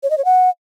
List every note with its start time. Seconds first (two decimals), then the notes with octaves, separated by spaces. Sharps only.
0.03 C#5
0.10 D#5
0.18 C#5
0.25 F#5